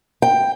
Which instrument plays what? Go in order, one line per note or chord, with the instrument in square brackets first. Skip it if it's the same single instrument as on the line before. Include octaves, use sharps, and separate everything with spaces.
[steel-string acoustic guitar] G5